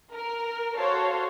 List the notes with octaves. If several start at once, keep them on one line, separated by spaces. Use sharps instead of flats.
A#4
F#4 A4 C5 C#5 F5